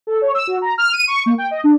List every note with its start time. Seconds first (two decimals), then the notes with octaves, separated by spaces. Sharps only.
0.07 A4
0.21 C#5
0.34 E6
0.47 F#4
0.62 A#5
0.78 F6
0.93 D#7
1.07 C#6
1.26 A#3
1.38 G5
1.51 D#5
1.64 D4